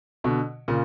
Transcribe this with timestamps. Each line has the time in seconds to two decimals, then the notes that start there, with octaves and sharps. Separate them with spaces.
0.24 B2 D3
0.68 A#2 C#3